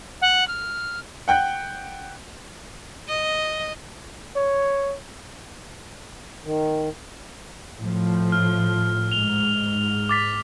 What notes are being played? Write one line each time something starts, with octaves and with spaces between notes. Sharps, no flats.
F#5
F6
F#5 G5 F#6 G6
D#5
C#5
D#3
A2 F3
F6
G#2 F7 G7
D6 A6 B6